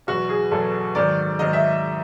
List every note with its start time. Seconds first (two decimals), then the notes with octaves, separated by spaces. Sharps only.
0.07 E2 B2 F#3 F#4
0.29 G#4
0.51 E2 B2 F#3 A4
0.95 G#2 D#3 F#3 D5
1.39 G#2 D#3 F#3 D#5
1.53 E5